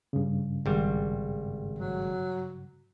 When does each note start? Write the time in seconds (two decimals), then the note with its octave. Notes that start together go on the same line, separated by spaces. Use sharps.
0.13 G2 C#3
0.66 G#1 G3
1.79 F#3